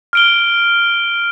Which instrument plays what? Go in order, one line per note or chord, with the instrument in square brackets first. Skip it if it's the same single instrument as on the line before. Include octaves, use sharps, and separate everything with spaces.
[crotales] F6 D7 G7